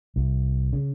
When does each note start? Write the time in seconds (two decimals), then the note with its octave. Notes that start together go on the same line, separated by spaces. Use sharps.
0.16 C2
0.73 C#3